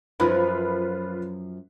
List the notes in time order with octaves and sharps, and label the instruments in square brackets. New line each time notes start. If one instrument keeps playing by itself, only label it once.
[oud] F#2 F3 [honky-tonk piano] F4 B4 B5